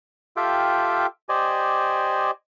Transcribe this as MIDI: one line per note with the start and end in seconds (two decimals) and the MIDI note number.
0.37 1.06 65
0.37 1.06 67
0.37 1.06 69
0.37 1.06 76
0.37 1.06 77
0.37 1.06 79
1.29 2.31 67
1.29 2.31 72
1.29 2.31 74
1.29 2.31 75
1.29 2.31 80